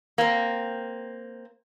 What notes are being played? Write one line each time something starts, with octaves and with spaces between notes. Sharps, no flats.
A#3 C4